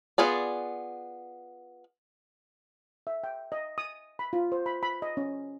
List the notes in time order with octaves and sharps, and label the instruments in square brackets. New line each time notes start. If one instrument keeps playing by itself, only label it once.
[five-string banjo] B3 F4 G#4 D5
[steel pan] E5
G5
D#5
D#6
B5
F4
C5
B5
B5
D#5
C#4